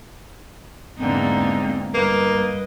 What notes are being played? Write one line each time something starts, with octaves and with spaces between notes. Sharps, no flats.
E2 G#2 D3 A#3 C4 D#4
G2 A#3 B4 D#5